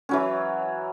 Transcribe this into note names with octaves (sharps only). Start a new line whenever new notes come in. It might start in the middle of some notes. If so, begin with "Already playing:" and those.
E3 F#3 C#4